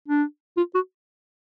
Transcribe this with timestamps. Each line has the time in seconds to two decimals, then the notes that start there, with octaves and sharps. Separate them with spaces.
0.08 D4
0.57 F4
0.74 F#4